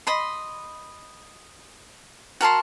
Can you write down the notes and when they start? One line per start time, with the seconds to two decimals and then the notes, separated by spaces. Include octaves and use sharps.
0.07 D#5 B5 C6
2.41 F#4 A#4 A5 C6